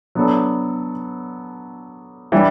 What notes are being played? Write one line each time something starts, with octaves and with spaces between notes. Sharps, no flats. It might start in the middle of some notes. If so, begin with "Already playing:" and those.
F#3 B3 D4 A4
E3 G3 D4